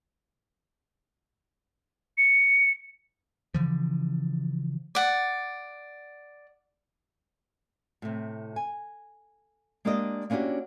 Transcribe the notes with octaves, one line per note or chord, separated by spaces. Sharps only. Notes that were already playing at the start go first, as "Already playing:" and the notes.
C#7
C#3 E3 F3
D5 F#5
A2 C3
G#5
G#3 A#3 D4 G4 D5 D#5
A#3 C#4 D4 E4 F#4 G4